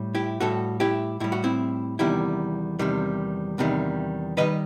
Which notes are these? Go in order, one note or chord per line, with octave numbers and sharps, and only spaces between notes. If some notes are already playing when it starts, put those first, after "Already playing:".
Already playing: A2 G3
E4 G4
A2 G3 F#4 A4
E4 G4
A2 G3 E4
F#4
C4 E4
E2 C3 D#3 G3 E4 G4
E2 C3 D#3 G3
E2 C3 D#3 G3
C3 D#3 G3 B4 D#5